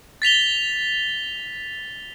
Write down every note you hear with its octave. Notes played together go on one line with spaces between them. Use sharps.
A6 B6 F7 G7